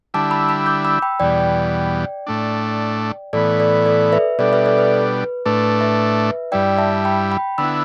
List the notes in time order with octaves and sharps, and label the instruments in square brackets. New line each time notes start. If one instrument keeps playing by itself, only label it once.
[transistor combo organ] D3 G3 E4 [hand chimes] A5 D6
[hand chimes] B5 E6
B5 E6
D6 G6
B5 E6
G5 B5
[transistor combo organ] E2 B2 G3 [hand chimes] D5 G5
[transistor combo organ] A2 A3 D4
[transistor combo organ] A2 E3 B3 [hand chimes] A4 D5
[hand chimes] A4 D5
A4 D5
B4 E5
[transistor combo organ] B2 G3 D4 [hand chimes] A4 D5
[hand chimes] B4 E5
A4 D5
B4
[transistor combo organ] A2 A3 D4 [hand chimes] B4
[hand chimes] B4
B4 E5
[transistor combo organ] G2 G3 E4 [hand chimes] D5 G5
[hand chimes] E5 A5
G5 B5
G5 B5
[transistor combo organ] D3 B3 E4 [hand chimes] B5 E6